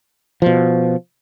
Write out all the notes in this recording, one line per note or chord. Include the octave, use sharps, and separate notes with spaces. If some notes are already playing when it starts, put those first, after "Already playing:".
B2 F3